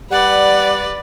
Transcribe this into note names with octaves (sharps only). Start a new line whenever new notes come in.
G3 B4 D5 F#5